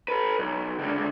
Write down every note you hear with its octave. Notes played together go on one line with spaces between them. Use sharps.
A4 B4
B1
C#2 D3